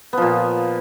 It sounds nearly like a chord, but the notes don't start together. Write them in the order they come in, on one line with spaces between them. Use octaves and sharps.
B3 F3 A#2